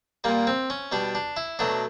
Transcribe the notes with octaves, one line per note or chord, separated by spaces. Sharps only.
A#2 G3 A#3
C4
C#4
B2 G3 D4
D4
E4
B2 F#3 A3 D4